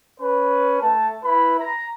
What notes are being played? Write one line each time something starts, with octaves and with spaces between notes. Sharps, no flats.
C#4 B4
A3 A5
E4 B4 B5
A#5